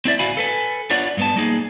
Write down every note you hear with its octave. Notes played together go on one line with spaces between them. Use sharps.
C4 E4 D5 E5
D2 A2 F#4 F5 G#5 B5
A4 B4 G#5
B3 D4 F4 C#5 D5 F#5
G2 B3 A5
G3 A#3 D#4 G#4